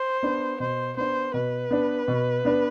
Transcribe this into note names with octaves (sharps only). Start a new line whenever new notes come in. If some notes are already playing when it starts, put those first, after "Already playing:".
Already playing: C5
B3 D4
B2 C5
B3 D4 C5
B2 B4
B3 D4
B2
B3 D4